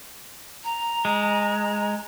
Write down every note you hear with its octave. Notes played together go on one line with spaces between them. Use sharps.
A#5
G#3